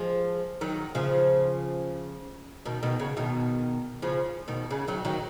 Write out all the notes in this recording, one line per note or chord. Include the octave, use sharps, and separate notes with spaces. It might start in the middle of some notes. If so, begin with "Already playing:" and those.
Already playing: F3 G#3
D#3 F#3
C#3 F3
B2 D#3
B2 D#3
C#3
B2 D#3
C#3 F3
B2 D#3
C#3
D#3 F#3
D#3 F#3